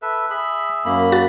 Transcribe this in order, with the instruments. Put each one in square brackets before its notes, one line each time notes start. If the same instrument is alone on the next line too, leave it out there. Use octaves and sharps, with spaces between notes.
[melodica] A4 B4 E5
[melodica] G#4 E5 [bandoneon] B5
[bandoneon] F#2 A#3 B5
[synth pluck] F#4 A6